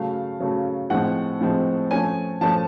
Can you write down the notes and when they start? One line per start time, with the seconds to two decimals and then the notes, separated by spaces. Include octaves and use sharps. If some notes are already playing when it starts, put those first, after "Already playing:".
Already playing: C#3 F#3 A3 F5
0.40 C#3 F#3 A3
0.90 A2 F3 G#3 C4 F#5
1.40 A2 F3 G#3 C4
1.91 F3 A3 C#4 G#5
2.41 F3 A3 C#4 A5